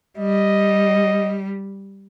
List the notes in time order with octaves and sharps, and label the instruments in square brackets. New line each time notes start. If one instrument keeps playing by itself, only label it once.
[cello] G3 [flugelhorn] D#5